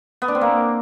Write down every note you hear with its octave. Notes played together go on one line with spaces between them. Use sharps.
B3
D4
C4
A#3